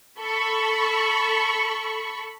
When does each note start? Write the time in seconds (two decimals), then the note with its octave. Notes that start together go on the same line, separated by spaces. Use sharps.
0.19 A4 B5 C#6